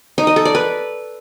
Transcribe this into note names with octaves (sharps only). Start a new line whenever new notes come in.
D#4
D#5
A4
D5
B4